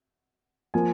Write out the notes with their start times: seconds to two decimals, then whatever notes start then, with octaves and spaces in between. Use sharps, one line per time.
0.74 F3 A#3 G#5